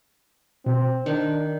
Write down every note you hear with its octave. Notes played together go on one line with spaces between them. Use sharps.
B2 C4
D#3 D4